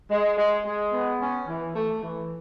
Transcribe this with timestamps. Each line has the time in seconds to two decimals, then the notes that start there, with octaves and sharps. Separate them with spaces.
0.10 G#3
0.37 G#3
0.65 G#3
0.92 B3
1.20 C#4
1.47 E3
1.75 A3
2.03 E3